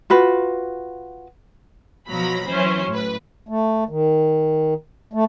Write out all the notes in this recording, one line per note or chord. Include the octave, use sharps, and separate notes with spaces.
F4 F#4 B4
B2 F3 F#3 A#5 B5
E3 F#3 C#4 C5
A2 B4
A3
D#3
A3